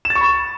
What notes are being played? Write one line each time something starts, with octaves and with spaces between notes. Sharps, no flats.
E7
A6
C#6
B5